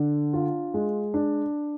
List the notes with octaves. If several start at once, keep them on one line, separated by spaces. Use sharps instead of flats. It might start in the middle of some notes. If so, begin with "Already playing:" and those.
Already playing: D3 D4
F4
G#3
D4